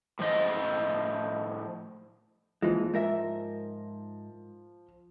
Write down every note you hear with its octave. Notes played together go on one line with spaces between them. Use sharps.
A2 F3 C5 D#5
A#2 E3 F3 G#3
G#2 A#4 E5